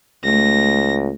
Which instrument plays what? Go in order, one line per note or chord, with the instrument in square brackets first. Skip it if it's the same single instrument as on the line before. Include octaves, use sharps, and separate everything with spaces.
[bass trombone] C#2 [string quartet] A3 [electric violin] A#6